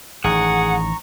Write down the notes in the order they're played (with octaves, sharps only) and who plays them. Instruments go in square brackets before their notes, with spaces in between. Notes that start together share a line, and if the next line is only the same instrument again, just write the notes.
[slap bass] A1 D#3 [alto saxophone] G#4 [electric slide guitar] F#5 [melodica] A#5 C#6